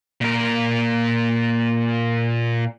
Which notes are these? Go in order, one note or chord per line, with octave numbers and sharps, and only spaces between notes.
A#2 A#4